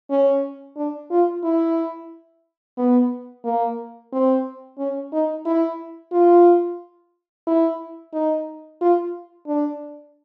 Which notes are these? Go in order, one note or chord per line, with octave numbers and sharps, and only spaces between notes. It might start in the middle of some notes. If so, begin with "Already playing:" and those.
C#4
D4
F4
E4
B3
A#3
C4
C#4
D#4
E4
F4
E4
D#4
F4
D4